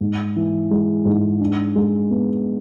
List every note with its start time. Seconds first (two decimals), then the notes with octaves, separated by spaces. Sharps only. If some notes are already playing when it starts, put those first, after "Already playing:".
0.01 G#2
0.36 E3
0.71 G#3
1.05 G#2
1.41 D4
1.76 G#3
2.11 B3